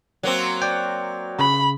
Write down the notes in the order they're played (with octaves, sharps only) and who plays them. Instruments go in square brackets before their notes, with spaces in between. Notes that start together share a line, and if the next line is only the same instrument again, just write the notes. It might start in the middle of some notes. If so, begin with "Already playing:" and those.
[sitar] F#3 A#3 C4
[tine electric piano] D5 G5
[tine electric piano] C#3 [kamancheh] B5